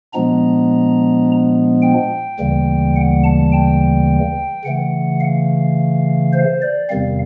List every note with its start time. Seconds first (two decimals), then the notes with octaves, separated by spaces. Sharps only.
0.14 A#2 F3 G#3 B3 D4 A#5
1.82 G5
2.40 D2 C#3 E3 G3 A#3
2.96 F#5
3.24 A5
3.52 G5
4.64 C#3 E3 A3 F#5
5.20 F5
6.33 C5
6.62 D5
6.89 E2 C3 D#3 G3 C4 F5